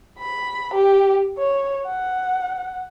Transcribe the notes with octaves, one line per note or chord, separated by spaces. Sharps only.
B5
G4
C#5
F#5